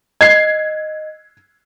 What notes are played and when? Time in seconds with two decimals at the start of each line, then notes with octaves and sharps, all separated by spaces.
0.21 D#5 G#6 C7